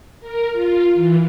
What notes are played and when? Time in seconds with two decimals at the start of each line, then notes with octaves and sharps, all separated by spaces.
0.20 A#4
0.52 F4
0.95 E3